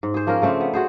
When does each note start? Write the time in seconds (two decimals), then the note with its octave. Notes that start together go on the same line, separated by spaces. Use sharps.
0.03 G#2
0.14 G#4 C5
0.27 F3 A#3 C#4 A#4
0.42 C#3 A3 C4 D4
0.61 B3
0.73 F#4 G#4 C5